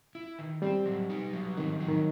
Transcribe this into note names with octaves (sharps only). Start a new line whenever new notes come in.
E4
D#3
G3 C4
F#3
D#4
F#3
D#3 C4
F#3
D#3